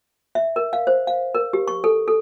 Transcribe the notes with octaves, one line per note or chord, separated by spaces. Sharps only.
E5
A#4
F5
C5
F5
A#4
G4
C#6
A4
A4